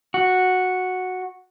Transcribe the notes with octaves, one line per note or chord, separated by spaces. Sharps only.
F#4